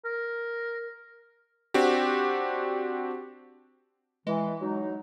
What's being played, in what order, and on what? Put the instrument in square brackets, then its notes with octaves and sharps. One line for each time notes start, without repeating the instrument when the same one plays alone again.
[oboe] A#4
[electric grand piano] C4 D4 F#4 G4
[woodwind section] E3 [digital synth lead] G#3
[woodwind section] F#3 D#4